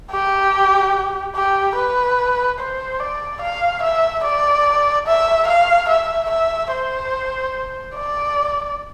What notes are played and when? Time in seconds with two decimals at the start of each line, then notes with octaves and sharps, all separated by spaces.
0.11 G4
1.35 G4
1.76 B4
2.59 C5
3.00 D5
3.42 F5
3.83 E5
4.24 D5
5.07 E5
5.48 F5
5.89 E5
6.31 E5
6.72 C5
7.96 D5